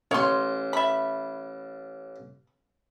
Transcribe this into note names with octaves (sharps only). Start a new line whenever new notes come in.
A1 C#5 C6
E5 B5